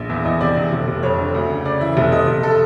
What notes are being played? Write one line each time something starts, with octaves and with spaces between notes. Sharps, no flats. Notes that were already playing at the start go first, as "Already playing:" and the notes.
Already playing: A#1
E2 E5
E2 D#5
C3 D5
E2
F1
F1
F2 C#5
D3
D2
C#3
C#3 D5
E3 E5
F1 E5
F1 D#5
F1
A4